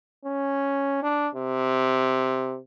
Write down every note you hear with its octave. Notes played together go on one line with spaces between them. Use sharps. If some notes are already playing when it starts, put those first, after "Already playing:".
C#4
D4
C3